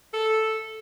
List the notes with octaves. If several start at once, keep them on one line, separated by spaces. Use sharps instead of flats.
A4